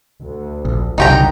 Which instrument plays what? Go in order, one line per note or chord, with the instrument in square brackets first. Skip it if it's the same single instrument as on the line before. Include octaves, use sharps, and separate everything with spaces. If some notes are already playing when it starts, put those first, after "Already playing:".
[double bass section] D2
[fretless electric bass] A#1
[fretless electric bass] F#1 [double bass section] C2 D3 F3 [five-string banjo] D#4 G4 A#5